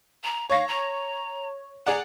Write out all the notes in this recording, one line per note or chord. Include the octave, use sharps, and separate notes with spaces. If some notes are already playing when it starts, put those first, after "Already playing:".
A#5
C#5 F5 C#6 A#6
A#5
G#4 D5 F#5 A#5